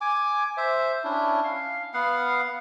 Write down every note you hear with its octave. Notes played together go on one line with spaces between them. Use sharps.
G#5 D6
C5 E5
C#4 D4 E4
F5
B3 F5 F#5